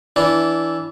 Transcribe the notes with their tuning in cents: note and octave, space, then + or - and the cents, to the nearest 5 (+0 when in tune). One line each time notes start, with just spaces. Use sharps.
E3 +0 D4 -20